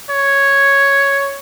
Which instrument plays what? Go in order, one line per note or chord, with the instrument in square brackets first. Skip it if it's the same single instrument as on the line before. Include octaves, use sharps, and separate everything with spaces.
[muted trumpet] C#5